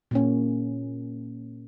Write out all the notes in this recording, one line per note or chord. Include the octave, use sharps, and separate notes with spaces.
A#2 A#3 C#4